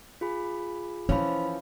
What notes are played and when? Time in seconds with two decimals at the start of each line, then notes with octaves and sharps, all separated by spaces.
0.21 F4 G#4 B5
1.09 E3 F3 C#4 E4 C5 B5